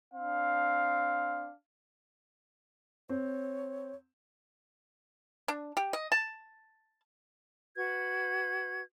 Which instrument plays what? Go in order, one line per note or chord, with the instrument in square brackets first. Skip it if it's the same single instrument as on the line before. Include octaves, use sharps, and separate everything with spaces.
[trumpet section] C4 D4 F5
[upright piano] C4 [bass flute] C#5
[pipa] D4
G4
D#5
A5
[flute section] F#4 B4 G#6